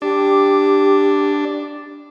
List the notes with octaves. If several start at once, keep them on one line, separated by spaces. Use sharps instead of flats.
D4 G4